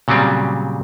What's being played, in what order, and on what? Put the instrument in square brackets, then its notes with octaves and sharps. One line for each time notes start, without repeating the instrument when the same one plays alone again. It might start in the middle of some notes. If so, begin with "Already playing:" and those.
[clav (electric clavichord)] A#2 C#3 F#3 G3 C4